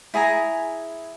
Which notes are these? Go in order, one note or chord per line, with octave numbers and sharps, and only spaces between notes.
E4 G#4 G#5 A#5